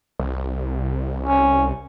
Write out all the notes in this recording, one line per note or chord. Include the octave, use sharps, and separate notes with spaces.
C2
C#4